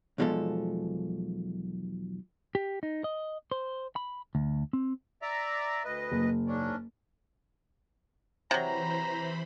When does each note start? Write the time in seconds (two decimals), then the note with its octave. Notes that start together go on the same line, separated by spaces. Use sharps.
0.18 B1 E2 B2 F3 G#3 A4
2.55 G4
2.83 D#4
3.04 D#5
3.51 C5
3.96 B5
4.35 D2
4.73 C4
5.22 D5 E5 A#5
5.84 D2 B4 D#5
6.12 F#1
6.47 G#2 C#4 D4
8.51 C3 E3 F#3 C5 A#5 B5